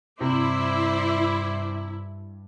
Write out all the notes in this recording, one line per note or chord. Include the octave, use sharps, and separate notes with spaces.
G2 C3 E4 C5 D5